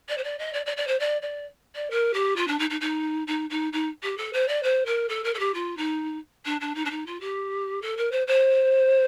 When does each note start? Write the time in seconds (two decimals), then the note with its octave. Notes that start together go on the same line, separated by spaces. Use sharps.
0.08 D5
0.17 C5
0.24 D5
0.38 D#5
0.53 D5
0.66 D5
0.77 D5
0.87 C5
0.99 D5
1.22 D5
1.75 D5
1.90 A#4
2.13 G4
2.36 F4
2.47 D4
2.59 D#4
2.70 D#4
2.81 D#4
3.27 D#4
3.50 D#4
3.72 D#4
4.03 G4
4.17 A4
4.33 C5
4.48 D5
4.63 C5
4.86 A#4
5.08 A4
5.24 A#4
5.34 A4
5.39 G4
5.54 F4
5.77 D#4
6.45 D4
6.60 D4
6.75 D#4
6.85 D4
6.90 D#4
7.06 F4
7.20 G4
7.82 A4
7.97 A#4
8.11 C5
8.27 C5